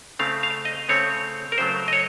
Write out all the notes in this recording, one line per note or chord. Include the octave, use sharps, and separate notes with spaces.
C#3 A3 C4 F5
F5
D#5
C#3 A3 C4 C#5
A#4
C#3 F#3 A3 C5
D#5
C#5